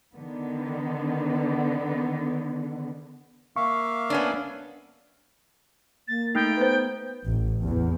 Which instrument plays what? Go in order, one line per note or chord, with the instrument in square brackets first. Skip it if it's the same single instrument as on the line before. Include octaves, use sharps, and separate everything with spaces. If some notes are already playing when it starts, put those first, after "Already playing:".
[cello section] D3 D#3 B3
[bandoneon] A#3 E5 F5 [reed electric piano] C#6
[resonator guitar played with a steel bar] B3 C#4 D4
[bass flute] A#3 [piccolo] A6
[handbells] A3 D#4 [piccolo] G5
[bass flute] B3 [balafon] B4 C5
[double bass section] A1
E2